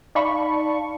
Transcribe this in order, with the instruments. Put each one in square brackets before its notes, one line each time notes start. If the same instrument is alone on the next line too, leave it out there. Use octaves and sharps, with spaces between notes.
[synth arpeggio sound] D#4 D5 F5 A5 B5 C#6